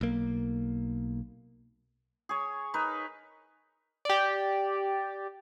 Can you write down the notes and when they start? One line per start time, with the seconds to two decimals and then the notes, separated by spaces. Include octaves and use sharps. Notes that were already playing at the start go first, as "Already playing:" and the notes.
0.01 B1 A#3
2.29 G#4 C#5
2.74 D#4 A#4 B4
4.05 G4 D5